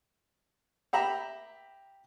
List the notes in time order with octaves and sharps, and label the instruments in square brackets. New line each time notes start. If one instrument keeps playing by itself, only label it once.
[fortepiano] G4 E5 A#5 B5